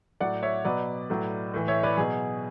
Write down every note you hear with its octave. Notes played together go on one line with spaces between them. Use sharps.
A2 F#3 D5 F#5
C#5 E5
B2 F#3 B4 D5
A2 F#3
A2 E3
C#5 E5
B4 D5
B2 F#3 G#4